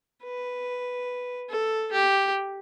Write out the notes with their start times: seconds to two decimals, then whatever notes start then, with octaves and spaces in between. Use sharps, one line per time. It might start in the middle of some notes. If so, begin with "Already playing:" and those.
0.23 B4
1.50 A4
1.92 G4